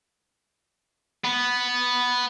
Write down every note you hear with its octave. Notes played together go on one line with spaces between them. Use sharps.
B3